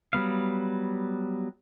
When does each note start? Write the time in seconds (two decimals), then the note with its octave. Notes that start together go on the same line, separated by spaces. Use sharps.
0.13 F#3 G3 B3 F5